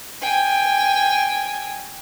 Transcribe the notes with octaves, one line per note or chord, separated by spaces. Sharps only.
G5 G#5